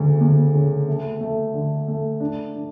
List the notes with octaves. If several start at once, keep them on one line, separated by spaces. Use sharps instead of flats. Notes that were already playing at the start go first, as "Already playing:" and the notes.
Already playing: D2 C#3
D2
C#3
A3
A3
D3
A3
D4
D4